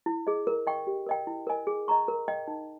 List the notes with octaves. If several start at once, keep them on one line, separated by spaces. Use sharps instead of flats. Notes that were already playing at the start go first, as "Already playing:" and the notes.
E4
G#4 D#5
A#4
D#5 G5 C#6
G4
A#4 D#5 G5
E4
A#4 D#5 G#5
G#4
D#5 A#5 C#6
A#4
D#5 G5
D#4